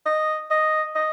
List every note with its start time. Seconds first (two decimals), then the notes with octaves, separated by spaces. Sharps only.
0.06 D#5
0.51 D#5
0.95 D#5